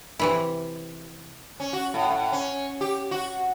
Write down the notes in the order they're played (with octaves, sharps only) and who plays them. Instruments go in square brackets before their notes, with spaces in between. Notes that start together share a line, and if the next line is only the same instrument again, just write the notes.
[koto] C3 E3 E4
[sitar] C#4
F#4
A2
A2
C#4
G4
F#4